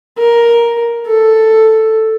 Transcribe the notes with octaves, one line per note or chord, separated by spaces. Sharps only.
A#4
A4